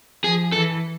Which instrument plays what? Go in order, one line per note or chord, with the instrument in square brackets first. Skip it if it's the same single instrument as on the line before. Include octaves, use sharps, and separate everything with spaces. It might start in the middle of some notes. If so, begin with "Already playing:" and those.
[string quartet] F3 [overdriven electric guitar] G#4
[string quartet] E3 [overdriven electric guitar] A4